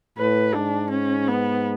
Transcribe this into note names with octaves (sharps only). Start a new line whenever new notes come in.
A2 B4
G#2 D4
C#4
B3